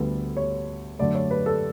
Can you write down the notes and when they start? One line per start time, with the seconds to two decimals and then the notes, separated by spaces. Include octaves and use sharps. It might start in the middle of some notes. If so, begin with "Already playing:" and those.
Already playing: D2 D3 G3 B3 A4
0.37 C#5
0.99 F#2 D3 A3 D5
1.15 C#5
1.31 B4
1.46 A4